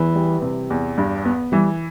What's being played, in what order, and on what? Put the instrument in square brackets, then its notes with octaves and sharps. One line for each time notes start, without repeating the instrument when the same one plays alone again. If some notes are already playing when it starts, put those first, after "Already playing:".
Already playing: [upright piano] E2 [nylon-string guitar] E3
[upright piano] G3
C3
E2
G2
B3
[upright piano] E3 [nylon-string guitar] G3